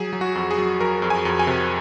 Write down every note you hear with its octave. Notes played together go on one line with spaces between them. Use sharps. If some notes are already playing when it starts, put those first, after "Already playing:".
Already playing: F#3 G#4
F#3
F#4
F2
G#4
F#3
F#3 A#4
F2
G#5
F2
G#5
C3